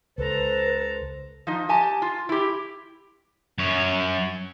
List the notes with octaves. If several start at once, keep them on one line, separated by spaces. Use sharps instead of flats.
C#2 A4 B4 C5 A#5
F3 D#4
G4 G#5 A5
F4
E4 G4
F#2 C#5